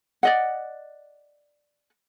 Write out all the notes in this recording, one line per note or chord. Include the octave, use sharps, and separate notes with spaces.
D5 D#5 F#5